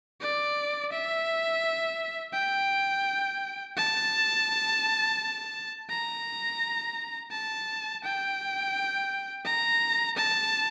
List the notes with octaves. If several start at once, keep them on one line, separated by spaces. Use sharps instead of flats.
D5
E5
G5
A5
A#5
A5
G5
A#5
A5